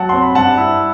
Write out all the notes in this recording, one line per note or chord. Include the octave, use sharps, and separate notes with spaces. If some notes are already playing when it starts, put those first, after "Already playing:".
Already playing: F#3 F#5 A5
C4 C6
B5
G2 F#5 A5
E4